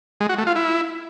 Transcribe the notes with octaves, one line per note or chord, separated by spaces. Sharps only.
G#3
F#4
A3
F4
E4